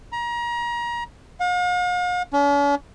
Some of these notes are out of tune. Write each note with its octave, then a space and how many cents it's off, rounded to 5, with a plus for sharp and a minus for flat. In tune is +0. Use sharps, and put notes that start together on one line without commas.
A#5 +30
F5 +45
C#4 +45